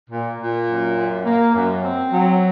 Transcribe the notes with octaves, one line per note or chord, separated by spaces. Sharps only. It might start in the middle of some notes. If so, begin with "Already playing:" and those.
A#2
A#2
F#2
F#2
A#3
F#2
C4
F#3